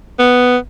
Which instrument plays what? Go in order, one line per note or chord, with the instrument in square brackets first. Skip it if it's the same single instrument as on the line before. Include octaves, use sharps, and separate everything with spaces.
[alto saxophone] B3